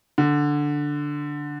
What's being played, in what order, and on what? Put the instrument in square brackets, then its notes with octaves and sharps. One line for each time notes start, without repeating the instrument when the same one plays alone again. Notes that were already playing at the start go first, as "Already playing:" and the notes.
[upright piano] D3